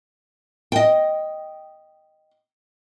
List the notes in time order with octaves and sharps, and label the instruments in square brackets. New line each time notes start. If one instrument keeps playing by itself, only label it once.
[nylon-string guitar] D#5 G5